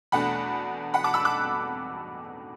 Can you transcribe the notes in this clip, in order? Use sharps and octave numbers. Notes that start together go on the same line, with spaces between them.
E2 B2 A3 D4 F#5 B5
F#5 B5
A5 D6
B5 E6
D6 F#6